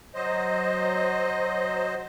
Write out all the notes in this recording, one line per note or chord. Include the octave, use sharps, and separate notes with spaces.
F#3 C5 D#5